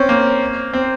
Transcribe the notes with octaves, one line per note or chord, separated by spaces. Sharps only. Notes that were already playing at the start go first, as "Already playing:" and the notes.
Already playing: C4 C#4
A#3
C4